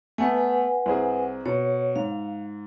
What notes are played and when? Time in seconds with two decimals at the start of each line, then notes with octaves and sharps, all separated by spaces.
0.18 A3 B3 B4 F#5 G#5
0.86 C2 C4 G#4
1.46 B2 C#5
1.96 G#2 F5